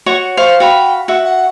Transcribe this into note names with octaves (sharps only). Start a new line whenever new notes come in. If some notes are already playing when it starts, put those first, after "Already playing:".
F#4 C#5 C#6
C5 F5 C#6
F#4 F5 G5 B5
F#4 E5 F#5
F#5